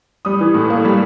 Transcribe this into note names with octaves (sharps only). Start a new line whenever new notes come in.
G3 D#6
E3
A2
A#3
G3